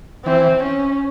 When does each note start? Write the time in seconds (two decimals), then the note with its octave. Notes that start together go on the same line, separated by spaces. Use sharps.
0.25 E3 C4
0.62 C#4